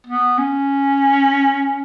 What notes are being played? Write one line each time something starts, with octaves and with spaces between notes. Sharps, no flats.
B3
C#4